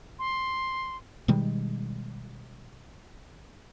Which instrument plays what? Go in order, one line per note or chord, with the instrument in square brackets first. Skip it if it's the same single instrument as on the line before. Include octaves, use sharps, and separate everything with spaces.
[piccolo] C6
[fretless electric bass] B2 D#3 G3 G#3